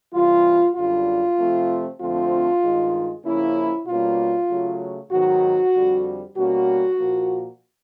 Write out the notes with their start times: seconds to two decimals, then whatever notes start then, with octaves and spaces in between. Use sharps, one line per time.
0.13 C3 E3 G3 F4
0.75 F#2 D3 G3 F4
1.38 C3 F3 A3 C4
1.99 F2 D3 F3 A3 C4 F4
2.62 G2 D#3 G#3
3.24 C#3 F3 A#3 C#4 E4
3.86 B2 G3 A#3 C#4 F4
4.50 C#3 F#3 A3
5.11 G#2 D#3 F#3 B3 F#4
5.73 F2 D3 G3
6.36 B2 G3 A#3 C#4 F#4
6.99 A#2 F3 A#3